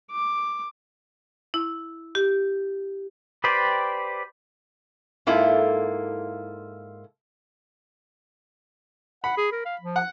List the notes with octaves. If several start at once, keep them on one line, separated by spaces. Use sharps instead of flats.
D6
E4
G4
G4 B4 C5 D5 G5
G#2 A#3 E4 F4 A4
F#5 B5
G#4
A#4
F5
F3
F#5